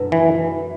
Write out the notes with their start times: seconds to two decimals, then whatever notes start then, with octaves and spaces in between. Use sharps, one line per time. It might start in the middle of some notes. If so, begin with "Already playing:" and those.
Already playing: F#2 B2 A3 B3 D4 E4
0.12 E3